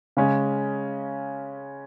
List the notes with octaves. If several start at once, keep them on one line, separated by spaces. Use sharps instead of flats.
C#3 G#3 C#4